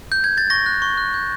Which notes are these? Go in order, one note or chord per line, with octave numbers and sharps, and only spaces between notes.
G6
G#6
A6
C#6 A#6
F#6
C#6
F#6
G6